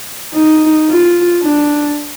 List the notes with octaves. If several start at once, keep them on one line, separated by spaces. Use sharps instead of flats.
D#4
F4
D4